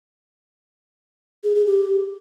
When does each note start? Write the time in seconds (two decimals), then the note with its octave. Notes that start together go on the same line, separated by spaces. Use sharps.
1.44 G#4
1.55 G#4
1.66 G4